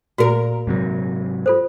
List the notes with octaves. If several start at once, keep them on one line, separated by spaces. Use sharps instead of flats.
A#2 F#4 A#4
G#2 C3 F#3
F4 A4 C5